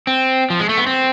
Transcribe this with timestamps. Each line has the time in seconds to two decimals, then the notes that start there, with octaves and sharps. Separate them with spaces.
0.07 C4
0.50 F3
0.59 G#3
0.69 A3
0.78 B3
0.87 C4